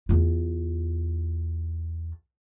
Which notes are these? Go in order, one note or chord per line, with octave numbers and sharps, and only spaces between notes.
E2 F4